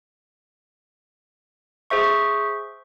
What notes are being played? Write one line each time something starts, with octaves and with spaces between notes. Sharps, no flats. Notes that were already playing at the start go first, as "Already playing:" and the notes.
G#4 C5 E5 C#6